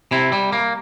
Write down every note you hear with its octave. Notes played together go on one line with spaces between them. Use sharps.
C3 C4 E4
G3
A#3